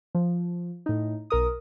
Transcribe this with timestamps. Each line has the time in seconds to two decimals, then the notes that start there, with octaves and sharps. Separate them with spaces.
0.15 F3
0.86 A2 D#4
1.30 B1 A#4 D#6